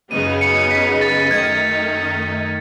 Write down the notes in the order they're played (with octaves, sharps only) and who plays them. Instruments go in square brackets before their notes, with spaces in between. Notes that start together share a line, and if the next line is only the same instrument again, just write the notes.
[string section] F#2 C#3 F#3 B3 D#4 [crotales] D#7
[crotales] C#7
B6
A6
[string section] F#2 D#3 A3 D#4 [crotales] G#6